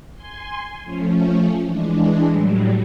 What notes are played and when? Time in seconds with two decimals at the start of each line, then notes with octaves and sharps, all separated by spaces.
0.15 G#5 C6
0.83 F3 A3 C#4
1.61 E3 G#3 D4
2.26 A2 F#3 G3